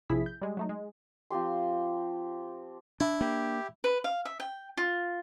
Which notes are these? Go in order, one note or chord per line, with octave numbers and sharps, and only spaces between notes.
A#1 C3 F3 E4 G#4 B6
G6
G3 G#3
F#3 A3 D#4
G#3
F3 C4 G4 C6
D4 E4
A#3 G4
B4
F5
E5
G5
F4